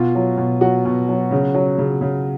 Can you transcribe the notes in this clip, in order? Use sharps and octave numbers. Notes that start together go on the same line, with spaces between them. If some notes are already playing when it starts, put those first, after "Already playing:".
Already playing: B2 F4
F#3
B2
F#3 F#4
B2
F#3
C#3
F#3
C#3
C#3